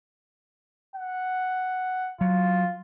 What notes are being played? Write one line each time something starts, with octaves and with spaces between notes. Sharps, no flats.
F#5
F#3 F4